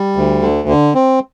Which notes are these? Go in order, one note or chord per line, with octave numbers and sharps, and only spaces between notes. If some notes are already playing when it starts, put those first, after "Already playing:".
Already playing: G3
D2
D3
D3
C4